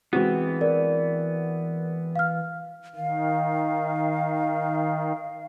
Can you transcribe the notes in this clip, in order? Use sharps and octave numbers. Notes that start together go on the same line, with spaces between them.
E3 G#3 B3 C4 F#4
A#4 D5
F5 F6
D#3 F5